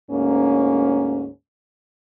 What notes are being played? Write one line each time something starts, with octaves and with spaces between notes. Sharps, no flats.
D2 G#2 A#3 C#4